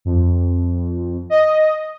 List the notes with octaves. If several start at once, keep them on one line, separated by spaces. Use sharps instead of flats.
F2
D#5